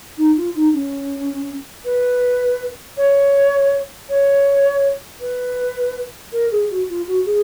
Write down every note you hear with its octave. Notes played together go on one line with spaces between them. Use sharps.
D#4
F4
D#4
C#4
B4
C#5
C#5
B4
A#4
G#4
F#4
F4
F#4
G#4